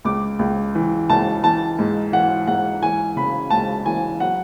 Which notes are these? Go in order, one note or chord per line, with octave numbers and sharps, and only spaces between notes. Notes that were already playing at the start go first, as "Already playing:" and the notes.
C#2 D6
C#2
E3
C#2 A5
E3 A5
G#2
E3 F#5
G#2 F#5
E3 G#5
C#3 B5
C#2 A5
E3 G#5
F#3 F#5